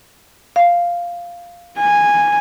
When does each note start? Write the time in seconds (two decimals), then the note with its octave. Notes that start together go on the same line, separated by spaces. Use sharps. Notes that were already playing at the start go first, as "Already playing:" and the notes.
0.56 F5
1.79 G#5